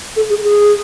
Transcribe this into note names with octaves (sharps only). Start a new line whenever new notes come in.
A4
G#4
G#4